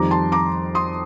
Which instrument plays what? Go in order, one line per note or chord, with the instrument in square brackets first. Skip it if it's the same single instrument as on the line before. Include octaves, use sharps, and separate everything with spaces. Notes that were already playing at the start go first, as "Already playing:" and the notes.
Already playing: [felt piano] F2 D#3 G3 A#5 D6
A5 C6
A#5 D6
C6 D#6